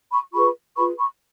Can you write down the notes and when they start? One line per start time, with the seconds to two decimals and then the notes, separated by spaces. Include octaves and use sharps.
0.11 B5 C#6
0.33 F4 G#4 B4 B5 C#6
0.76 F4 G#4 B4 B5 C#6
0.98 B5 C#6